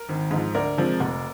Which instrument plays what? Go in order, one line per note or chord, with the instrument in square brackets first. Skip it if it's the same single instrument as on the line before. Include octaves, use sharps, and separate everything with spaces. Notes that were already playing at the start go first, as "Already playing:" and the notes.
Already playing: [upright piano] A#4
G#1
G#2
F3
D2 A#4 D5
C3 F3 G#3
F1